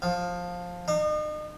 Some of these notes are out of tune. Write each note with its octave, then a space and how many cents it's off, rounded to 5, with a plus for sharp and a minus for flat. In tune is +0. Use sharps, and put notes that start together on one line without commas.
F3 +15
D#4 -40